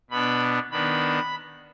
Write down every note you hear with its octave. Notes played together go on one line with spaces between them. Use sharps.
B2 B3 D4 B5
D#3 B3 D4 B5